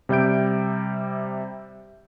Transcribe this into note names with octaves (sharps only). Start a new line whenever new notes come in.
C3 G3 E5 G6 D7